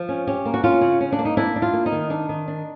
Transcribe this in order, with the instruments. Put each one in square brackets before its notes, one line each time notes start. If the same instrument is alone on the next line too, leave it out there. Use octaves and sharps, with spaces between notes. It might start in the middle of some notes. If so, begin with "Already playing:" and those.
Already playing: [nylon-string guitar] F3
C#4
C#4 G4
A#3
F#4
C#4 F4
C#3
C#4
D4
A#3
D#4
D4 E4
D4
F4
A#3
D#4
D#3
D4 D#4
D#3
D4